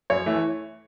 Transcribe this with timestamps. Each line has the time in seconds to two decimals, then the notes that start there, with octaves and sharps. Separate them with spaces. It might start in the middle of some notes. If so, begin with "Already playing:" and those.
0.10 F#2 C#5
0.26 E3 A3